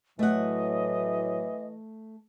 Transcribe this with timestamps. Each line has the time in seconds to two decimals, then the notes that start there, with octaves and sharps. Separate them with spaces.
0.19 A2 E3 F#3 A3 D#5 F#5